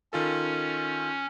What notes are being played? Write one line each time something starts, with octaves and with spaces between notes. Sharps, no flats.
D#3 C#4 F4 A4